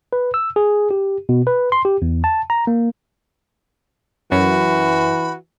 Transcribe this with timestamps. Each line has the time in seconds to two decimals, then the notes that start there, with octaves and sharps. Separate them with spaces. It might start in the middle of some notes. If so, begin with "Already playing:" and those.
0.13 B4
0.34 E6
0.56 G#4
0.91 G4
1.29 B2
1.47 B4
1.72 C6
1.85 G4
2.02 E2
2.24 A5
2.50 A#5
2.67 A#3
4.32 F#2 E3 F#4 B5